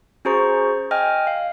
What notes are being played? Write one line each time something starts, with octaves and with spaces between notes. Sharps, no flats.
C#4 F#4 G#4 C5 A#5 C#6
D#5 G5 G#5 F6
F5